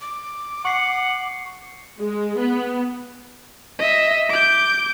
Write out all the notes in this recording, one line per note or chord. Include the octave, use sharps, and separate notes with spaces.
D6
F#5 C#6 C7 C#7
G#3
B3
D#5 E5
D6 G6